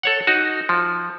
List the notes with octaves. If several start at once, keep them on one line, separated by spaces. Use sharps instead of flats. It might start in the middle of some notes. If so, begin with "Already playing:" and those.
A4 C#5 F#5
D#4 F#4
F3